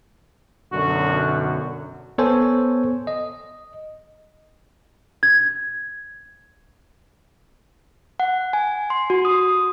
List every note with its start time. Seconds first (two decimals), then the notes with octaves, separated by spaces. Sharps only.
0.72 B1 F#2 D3 F#4
2.18 B3 A4 C5 C#5 G#5
3.07 D#5
5.23 G#6
8.20 F#5
8.53 G#5
8.90 C6
9.10 F#4
9.25 D#6